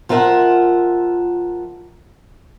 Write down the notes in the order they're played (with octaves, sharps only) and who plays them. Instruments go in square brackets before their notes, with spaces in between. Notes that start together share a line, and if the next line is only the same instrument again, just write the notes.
[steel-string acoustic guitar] F3 F4 A#4 E5 F#5